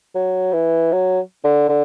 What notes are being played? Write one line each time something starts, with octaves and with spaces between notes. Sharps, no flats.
F#3
E3
F#3
D3
D3